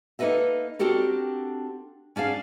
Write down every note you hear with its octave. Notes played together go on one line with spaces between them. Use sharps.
A#3 D#4 A4 B4 D#5 E5
C4 D4 F#4 G4 A4 A#4
C#4 D4 G#4 F5